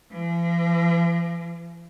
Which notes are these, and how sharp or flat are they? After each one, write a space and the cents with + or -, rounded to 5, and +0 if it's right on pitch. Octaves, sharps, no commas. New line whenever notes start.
F3 -45